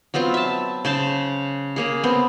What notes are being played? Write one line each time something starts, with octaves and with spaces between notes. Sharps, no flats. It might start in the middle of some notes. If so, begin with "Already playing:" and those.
F#3 B3 C4 F4
E5 A5
C#3 C5 A5
C#3 A#3 G#4
B3 C4